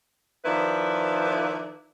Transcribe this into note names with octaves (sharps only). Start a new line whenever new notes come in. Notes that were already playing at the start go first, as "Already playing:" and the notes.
D#3 F3 E4 B4 D5